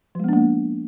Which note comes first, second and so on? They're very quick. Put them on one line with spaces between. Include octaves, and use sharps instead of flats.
F3 G#3 B3 D4 A#3